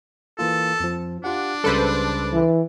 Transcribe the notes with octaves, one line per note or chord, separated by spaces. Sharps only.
E3 A#3 F4 A4
F2 F3
D4 F4 G4 F#5
C#2 C#3 G3 A4 B4 C5
E3